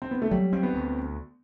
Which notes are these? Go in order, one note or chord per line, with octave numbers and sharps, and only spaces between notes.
C4
B3
A3
F#3 G3
C4
B3
D2